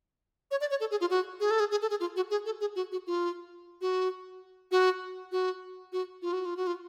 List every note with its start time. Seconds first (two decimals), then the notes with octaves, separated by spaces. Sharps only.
0.51 C#5
0.61 D5
0.71 C#5
0.80 A4
0.91 G#4
1.01 F4
1.10 F#4
1.40 G#4
1.51 A4
1.60 G#4
1.71 G#4
1.82 A4
1.90 G#4
2.00 F4
2.16 F#4
2.31 G#4
2.46 A4
2.61 G#4
2.76 F#4
2.92 F#4
3.07 F4
3.81 F#4
4.71 F#4
5.32 F#4
5.92 F#4
6.22 F4
6.33 F#4
6.45 F4
6.57 F#4
6.67 F4